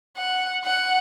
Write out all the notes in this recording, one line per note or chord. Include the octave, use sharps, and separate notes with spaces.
F#5
F#5